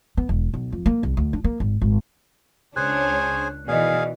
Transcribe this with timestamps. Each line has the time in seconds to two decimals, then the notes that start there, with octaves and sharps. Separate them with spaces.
0.17 B3
0.29 E1
0.54 B1
0.72 F2
0.86 A#3
1.03 C2
1.17 D2
1.33 D4
1.44 A#3
1.60 G#1
1.82 G#1
2.76 C#2 D4 G#4 C5 C#5 G#5 F#6
3.68 B2 D#3 E3 G#4 D5 D#5 F5